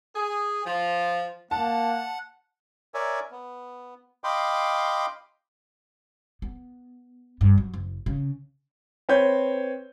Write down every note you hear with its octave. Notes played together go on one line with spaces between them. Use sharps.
G#4
F3
A#3 F#5 A5
A#4 C#5 D5 E5 G#5
B3
D#5 F5 G5 B5 C6 D6
B3
G2
F#3
F#1
C#3
C4 B4 C#5 G6